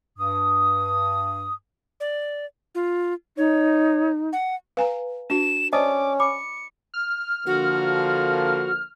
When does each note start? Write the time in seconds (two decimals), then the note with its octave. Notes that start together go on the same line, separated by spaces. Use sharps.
0.18 G2 D#6
2.00 D5
2.75 F4
3.37 D#4 C#5
4.33 F#5
4.77 B4 F5 G#5 A#5
5.30 D4 F#4 E7
5.73 C#4 C5 D5 D#5 A5 D6 D#6
6.20 B5 D6 C#7
6.94 F6
7.46 D3 F3 A#3 F#4